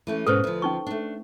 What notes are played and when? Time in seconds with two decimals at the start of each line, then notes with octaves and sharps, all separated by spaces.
0.07 E3 A3 C#4
0.27 G#2 B2 C#4 A4 B4 C5
0.44 D2 F3
0.62 C#4 D#4 C#6
0.87 A3 D4